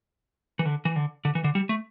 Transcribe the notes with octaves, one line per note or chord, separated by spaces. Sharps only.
E3
D3
E3
D3
D3
E3
D3
G3
A3